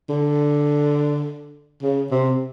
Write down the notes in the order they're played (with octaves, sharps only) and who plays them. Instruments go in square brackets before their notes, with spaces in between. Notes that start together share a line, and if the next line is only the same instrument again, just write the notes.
[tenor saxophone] D3
C#3
C3